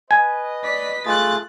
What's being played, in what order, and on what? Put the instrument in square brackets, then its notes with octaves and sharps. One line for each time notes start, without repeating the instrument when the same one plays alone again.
[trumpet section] B4 D#5 [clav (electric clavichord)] G#5
[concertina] D5 [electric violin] B6
[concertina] A3 F4 G#4 [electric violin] F#6 A6